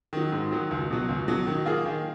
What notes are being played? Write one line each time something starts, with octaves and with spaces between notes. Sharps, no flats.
D#3 F#3
G#2
D#3 F#3
C#2
B2 F#3
C#2
B2 F#3
D#3
A#3 F4 G#4
D#3